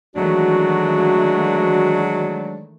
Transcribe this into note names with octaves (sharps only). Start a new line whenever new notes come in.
D#3 E3 F#3 G#3 A3 D4 F#4